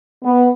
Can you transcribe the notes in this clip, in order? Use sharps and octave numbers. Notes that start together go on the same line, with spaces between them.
B3